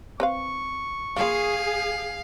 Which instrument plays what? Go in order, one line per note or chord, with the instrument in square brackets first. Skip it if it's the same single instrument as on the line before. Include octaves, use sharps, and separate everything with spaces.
[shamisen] C4 B4 F5 [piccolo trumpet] C#6
[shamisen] A#3 F4 [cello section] G#4 [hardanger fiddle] F5